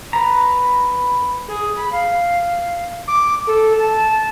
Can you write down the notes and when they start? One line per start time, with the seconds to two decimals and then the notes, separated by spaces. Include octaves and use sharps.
0.13 B4 A#5
1.48 G#4
1.76 B5
1.91 F5
3.07 D6
3.47 A4
3.79 A5